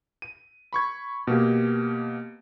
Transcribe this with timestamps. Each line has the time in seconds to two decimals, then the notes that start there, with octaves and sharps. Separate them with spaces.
0.22 D#7
0.73 B5 C#6 G#6
1.27 B2 A#3 G4